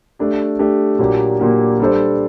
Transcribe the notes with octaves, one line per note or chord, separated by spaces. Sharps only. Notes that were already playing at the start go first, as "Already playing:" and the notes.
A3 D4 G4
A3 D4 G4
A#2 F#3 A#3 D4 G4
A#2 F#3 A#3 D4 G4
G3 D4 A4 C5